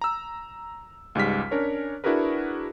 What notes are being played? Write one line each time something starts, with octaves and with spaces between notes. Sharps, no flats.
A#5 E6
C#2 G#2 G3 F6 B6
C#4 D4 A#4 C#5
D4 E4 F#4 G#4 A#4 B4